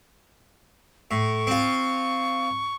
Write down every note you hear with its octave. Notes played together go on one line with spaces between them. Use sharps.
A2 C#6
C4 F4